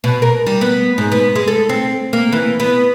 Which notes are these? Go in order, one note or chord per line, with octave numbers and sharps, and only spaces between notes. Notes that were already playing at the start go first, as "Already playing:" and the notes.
B2
A#4
G3
B3
G#2
B3
G#3
A4
C4
A#3
E3
B3